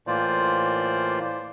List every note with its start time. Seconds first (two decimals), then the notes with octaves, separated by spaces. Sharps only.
0.07 A2 E3 A#3 F4 C5 D5